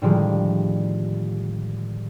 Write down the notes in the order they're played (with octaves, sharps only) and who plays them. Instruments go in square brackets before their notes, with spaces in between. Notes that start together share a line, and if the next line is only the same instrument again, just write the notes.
[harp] A2 D3 D#3 F3 G3 G#3